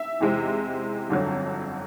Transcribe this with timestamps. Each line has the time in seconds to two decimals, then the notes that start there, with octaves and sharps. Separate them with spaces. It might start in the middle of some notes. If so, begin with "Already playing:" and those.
Already playing: E5
0.20 E2 C3 E3 G#3 C4
1.09 G1 F2 D3 F#3